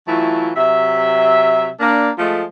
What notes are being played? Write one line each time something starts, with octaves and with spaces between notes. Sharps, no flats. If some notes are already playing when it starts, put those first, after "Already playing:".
E3 F#3 A3 E4 F4
C3 F#3 E5
A#3 D4
F3 G#3 A3